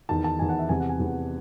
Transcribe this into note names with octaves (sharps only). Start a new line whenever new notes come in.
E2 D#3 A5
A5
E2 D#3 G#5
F#5
E5
E2 C3 E3 G#5
F#5
G#5
E2 C3 E3